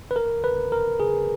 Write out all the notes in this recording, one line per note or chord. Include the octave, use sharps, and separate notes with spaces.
B4
A#4
B4
A#4
G#4